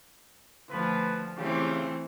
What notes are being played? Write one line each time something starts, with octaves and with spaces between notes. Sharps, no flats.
D2 F3 B4
C#3 E3 A3 C4 F4 G4